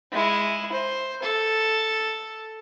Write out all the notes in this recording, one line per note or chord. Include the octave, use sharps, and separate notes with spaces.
G#3 E4
C5
A4